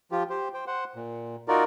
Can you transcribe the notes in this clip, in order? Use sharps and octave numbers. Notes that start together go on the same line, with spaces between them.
F3 F4 G4
G4 C5
C5 G5
C5 F#5
A#2
D#4 F4 F#4 A#4 D5